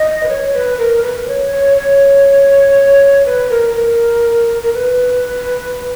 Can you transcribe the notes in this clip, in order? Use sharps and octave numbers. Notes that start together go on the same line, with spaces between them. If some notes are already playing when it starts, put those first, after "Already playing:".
Already playing: D#5
B4
C#5
B4
A#4
B4
C#5
C#5
C#5
B4
A#4
A#4
A#4
B4